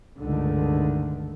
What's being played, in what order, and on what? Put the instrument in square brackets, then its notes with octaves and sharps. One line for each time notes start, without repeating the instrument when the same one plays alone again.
[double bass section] C#2 G2 D3 D#3 A3